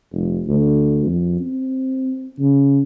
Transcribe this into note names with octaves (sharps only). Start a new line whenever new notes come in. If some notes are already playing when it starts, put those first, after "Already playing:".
F1
D2
F2
C4
C#3